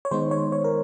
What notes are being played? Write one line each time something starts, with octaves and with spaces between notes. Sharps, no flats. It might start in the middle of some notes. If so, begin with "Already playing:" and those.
C#5
D#3 G#3 B3 D#4 C5
C#5
C#5
A#4